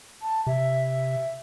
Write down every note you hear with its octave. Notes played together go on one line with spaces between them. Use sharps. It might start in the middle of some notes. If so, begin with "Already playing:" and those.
A5
C3 E5